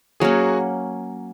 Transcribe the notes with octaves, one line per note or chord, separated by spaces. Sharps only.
F#3 A#3 C#4 F#4 G#4